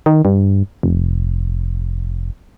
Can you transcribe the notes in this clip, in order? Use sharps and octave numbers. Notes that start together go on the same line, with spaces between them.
D#3
G2
F1